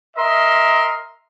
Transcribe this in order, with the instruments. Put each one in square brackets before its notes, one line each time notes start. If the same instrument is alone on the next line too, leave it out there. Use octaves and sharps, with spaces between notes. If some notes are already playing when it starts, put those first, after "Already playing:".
[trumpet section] A#4 D#5 E5 C6